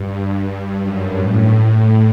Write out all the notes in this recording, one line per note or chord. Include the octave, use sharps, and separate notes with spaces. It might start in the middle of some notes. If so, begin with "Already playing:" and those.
Already playing: G2
F#2
A2
A2